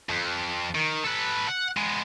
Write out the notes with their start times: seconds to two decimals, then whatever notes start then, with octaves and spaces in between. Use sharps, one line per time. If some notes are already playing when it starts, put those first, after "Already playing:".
0.09 F2
0.75 D#3
1.04 A4 B4
1.48 F#5
1.77 G#3 B3